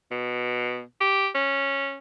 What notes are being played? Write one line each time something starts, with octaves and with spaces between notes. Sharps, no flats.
B2
G4
C#4